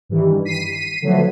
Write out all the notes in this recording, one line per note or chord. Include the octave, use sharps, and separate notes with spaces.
G2 D#3 E3 G3
B6 C7 D#7
D3 F3 F#3 A3 B3